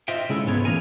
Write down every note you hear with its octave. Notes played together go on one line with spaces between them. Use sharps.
F4 C5 D#5 E5 G5
C#3 G#3 E4 A4
C#2 G#2 G#3 B3 C#5
A#2 E3 A#3 G#4 A#4 G#5